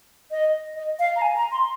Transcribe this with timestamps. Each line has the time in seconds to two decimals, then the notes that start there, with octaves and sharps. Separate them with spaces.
0.31 D#5
0.76 D#5
0.99 F5
1.16 A#5
1.22 G#5
1.36 A#5
1.52 C6